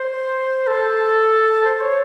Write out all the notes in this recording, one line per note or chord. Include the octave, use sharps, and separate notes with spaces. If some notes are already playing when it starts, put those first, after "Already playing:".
Already playing: C5
A4
C5
C#5